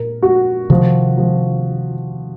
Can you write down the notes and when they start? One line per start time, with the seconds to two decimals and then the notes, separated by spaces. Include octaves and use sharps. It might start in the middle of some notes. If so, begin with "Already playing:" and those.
Already playing: A#2 A#4
0.22 F#4
0.70 C3 D#3 F3
1.18 F3